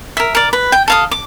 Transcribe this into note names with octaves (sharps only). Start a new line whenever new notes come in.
A#4 E5
A#4 D5
B4
G5
A4 F5 D#6
D6